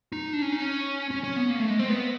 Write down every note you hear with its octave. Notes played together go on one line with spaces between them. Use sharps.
D#4
D4
C#4
D#4
C#4
C#4
C#4
B3
A#3
A3
G#3
C4
B3